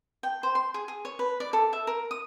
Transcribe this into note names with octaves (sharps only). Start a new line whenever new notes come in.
G5
C5
C6
G#4
G#4
C#5
B4
D5
A4
E5
A#4
D#6